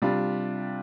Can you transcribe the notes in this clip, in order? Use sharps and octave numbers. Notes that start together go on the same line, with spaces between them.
C3 G3 D4 F4